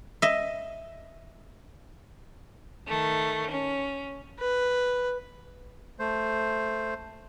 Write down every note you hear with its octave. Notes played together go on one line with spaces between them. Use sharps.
D#5 E5
D#3 A3
C#4
B4
A3 C5